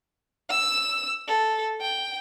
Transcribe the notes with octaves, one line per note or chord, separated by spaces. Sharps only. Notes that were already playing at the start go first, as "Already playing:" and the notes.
E6
A4
G5